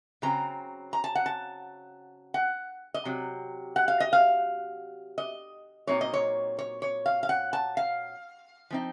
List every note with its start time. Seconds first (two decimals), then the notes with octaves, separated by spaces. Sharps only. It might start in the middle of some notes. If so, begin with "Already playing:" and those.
0.22 C#3 F#3 C4 A#5
0.93 A#5
1.04 A5
1.15 F#5
1.26 A5
2.34 F#5
2.94 D#5
3.05 C3 F#3
3.76 F#5
3.88 F5
4.00 D#5
4.13 F5
5.18 D#5
5.87 A#2 F#3 C4 D#4 C#5
6.01 D#5
6.14 C#5
6.59 C#5
6.82 C#5
7.06 F5
7.23 F5
7.29 F#5
7.53 A5
7.77 F5
8.71 F3 C4 D#4